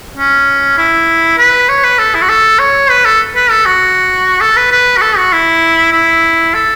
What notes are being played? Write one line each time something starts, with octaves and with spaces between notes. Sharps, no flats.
C#4
E4
B4
C#5
B4
A4
E4
F#4
A4
C#5
B4
A4
B4
A4
F#4
A4
B4
B4
F#4
A4
F#4
E4
E4
A4